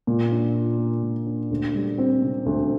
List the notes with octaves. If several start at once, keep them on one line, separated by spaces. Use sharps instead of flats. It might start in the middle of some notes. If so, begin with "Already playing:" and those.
A#2
D4
F4
A#3
A#2
D4
D2
G3
C4
C3
D2